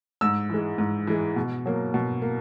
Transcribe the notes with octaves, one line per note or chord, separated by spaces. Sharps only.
G#2 E6
E3 G#3
G#2
E3 G#3
B2
F#3 A#3
B2
A#3